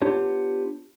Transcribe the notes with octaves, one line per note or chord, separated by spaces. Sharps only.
B3 D4 F4 G4 C#5